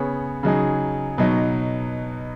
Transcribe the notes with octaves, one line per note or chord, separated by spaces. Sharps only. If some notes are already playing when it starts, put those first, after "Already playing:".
Already playing: C#3 B3 G#4 C#5
C#3 F#3 D#4 G#4
B2 F#3 D#4